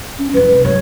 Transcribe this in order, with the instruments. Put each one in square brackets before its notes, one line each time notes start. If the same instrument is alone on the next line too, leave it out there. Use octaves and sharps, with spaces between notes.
[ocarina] C#4
[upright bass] F#2 E4 [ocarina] B4
[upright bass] C2
[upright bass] G2 F#3 [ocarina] C#5